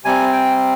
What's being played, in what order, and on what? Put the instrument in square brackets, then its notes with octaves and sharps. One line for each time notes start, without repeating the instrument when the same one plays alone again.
[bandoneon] C3 G3 C4 G#5
G5